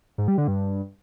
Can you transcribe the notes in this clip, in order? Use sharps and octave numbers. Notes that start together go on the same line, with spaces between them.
G#2
G3
D3
G2